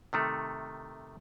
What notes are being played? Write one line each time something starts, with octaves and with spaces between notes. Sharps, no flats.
C3 D#3 A3